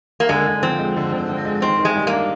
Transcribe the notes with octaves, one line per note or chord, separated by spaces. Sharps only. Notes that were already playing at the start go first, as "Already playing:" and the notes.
A#3
D3 G#3
D3
F3 C4
G#3
D3
D3
F3
G#3
D#3 C4
D#3
G#3
G3
A#3
D4